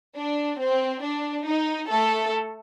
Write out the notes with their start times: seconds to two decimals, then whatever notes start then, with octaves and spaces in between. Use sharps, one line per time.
0.17 D4
0.61 C4
1.04 D4
1.47 D#4
1.90 A3 A4